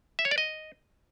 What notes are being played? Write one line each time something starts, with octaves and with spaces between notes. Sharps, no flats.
E5
C#5
D5
D#5